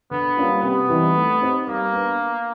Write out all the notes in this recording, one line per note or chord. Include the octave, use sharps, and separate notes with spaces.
D3 B3
G3 A#3 C#4 F4
C3 B3
E3 G3 C4 D#4
A3
C4 D#4 G4 C5
G3 A#3
B3 D4